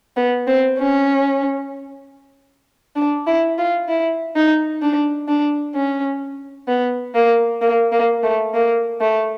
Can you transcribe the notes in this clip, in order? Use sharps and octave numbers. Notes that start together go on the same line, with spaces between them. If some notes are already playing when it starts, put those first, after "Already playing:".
B3
C4
C#4
D4
E4
F4
E4
D#4
D4
D4
C#4
B3
A#3
A#3
A#3
A3
A#3
A3